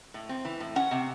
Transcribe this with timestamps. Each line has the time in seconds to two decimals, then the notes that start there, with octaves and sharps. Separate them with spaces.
0.14 A2
0.29 C4
0.45 E3
0.60 A2
0.75 C#4 F#5
0.91 C3